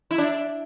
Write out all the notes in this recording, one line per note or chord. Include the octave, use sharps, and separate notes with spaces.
E4
D4